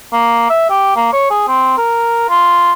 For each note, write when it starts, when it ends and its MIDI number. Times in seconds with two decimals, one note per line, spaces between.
0.13 0.47 58
0.50 0.68 76
0.70 0.95 67
0.96 1.12 58
1.13 1.29 73
1.30 1.44 68
1.48 1.73 60
1.77 2.27 70
2.29 2.72 65